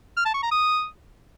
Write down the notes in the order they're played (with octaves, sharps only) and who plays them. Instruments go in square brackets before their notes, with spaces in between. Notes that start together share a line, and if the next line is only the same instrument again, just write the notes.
[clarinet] F6
A5
C#6
A#5
D#6